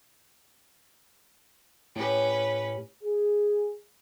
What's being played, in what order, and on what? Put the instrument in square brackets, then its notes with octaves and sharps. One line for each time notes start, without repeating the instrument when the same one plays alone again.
[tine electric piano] A2 G4 [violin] C#4 B4
[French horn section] G#4